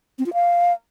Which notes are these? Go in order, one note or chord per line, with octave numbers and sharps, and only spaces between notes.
C4
F4
F5